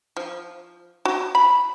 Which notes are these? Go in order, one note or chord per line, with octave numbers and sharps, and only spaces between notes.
F3
F#4
B5